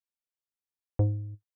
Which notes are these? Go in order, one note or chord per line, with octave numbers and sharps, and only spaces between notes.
G#2